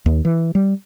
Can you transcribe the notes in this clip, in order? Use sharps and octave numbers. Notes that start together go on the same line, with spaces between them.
D#2
E3
G3